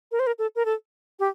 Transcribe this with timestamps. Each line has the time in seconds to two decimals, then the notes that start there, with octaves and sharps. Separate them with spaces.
0.12 A#4
0.19 C5
0.27 A#4
0.39 A4
0.56 A#4
0.65 A4
1.20 G4